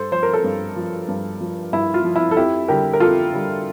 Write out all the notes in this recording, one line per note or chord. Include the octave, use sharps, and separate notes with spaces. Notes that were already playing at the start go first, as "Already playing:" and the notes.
Already playing: G2 A4 C5
F3 C5
A#4
A4 C5
G2
F3
G2
F3
G2 E4
F4
F3
E4
A4
F2 E4 G4
D3 G3 G4 A#4
A#4
F2 F4 A4
D3 G3